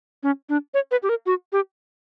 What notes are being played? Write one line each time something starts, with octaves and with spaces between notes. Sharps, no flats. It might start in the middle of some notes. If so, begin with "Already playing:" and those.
C#4
D4
C#5
B4
G4
A#4
F#4
G4